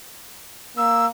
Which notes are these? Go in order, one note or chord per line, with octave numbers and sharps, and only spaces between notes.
A#3 E6